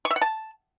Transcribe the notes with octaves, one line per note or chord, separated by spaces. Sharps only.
C#6
E5
F#5
A5